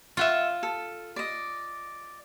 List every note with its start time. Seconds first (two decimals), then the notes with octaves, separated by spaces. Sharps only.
0.17 F4 E5 F#5 C#6
0.63 A4
1.16 D5 D#5